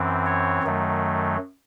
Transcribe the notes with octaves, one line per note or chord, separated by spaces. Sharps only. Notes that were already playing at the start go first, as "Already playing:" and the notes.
Already playing: F#2 E3 C4
C#5
F#2 D#3 F#3 A3